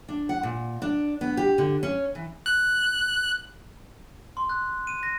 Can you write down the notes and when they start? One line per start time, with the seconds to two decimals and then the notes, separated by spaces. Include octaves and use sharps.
0.09 D4
0.29 F#5
0.43 A#2
0.82 D4
1.21 B3
1.37 G4
1.58 D3
1.83 C#4
2.15 E3
2.46 F#6
4.37 C6
4.49 F#6
4.87 D#7
5.03 A#6